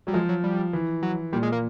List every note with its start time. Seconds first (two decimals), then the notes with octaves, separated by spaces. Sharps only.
0.07 F#3 G3
0.14 F3 G#3
0.29 F#3
0.44 G3
0.73 E3
1.02 F#3
1.33 A#2 G3
1.43 G#3
1.52 A#3